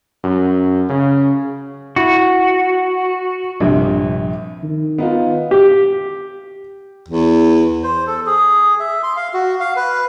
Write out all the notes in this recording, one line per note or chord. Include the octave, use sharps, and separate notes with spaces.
F#2
C#3
E4 F#4
A#1 G2 C3
D#3
B3 D#4 F4
G4
E2
C5
A4
G#4
E5
C6
F5
F#4
F5
B4